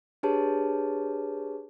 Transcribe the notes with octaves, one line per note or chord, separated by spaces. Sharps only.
D4 G4 G#4 B4 C#5 A5